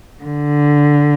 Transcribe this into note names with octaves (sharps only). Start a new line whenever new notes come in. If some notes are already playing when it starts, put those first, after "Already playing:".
D3